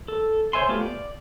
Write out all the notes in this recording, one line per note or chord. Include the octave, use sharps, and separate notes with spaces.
A4
C5 C#5 E5 G#5 C6
A3 B3 F4 G4
D5